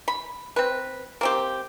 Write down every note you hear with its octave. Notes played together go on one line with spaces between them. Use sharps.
B5
C4 B4
A#3 C4 G4